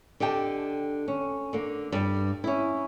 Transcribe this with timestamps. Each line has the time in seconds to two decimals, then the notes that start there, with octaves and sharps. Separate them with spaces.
0.20 D3 G4 D#5 G5 A5
1.08 C#4
1.53 D3 A#3
1.92 G2 G3
2.44 C#4 E4